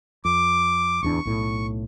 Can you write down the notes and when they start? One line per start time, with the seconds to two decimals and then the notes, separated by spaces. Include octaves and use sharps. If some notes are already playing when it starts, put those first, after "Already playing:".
0.25 F2 D6
1.02 D1 E2 D4 C#6
1.25 B1 A2